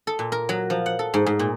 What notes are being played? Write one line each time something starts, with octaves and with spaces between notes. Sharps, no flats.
A4
A#2
A#4
F#3
F3
F#5
A4
G#2
G#2
A#2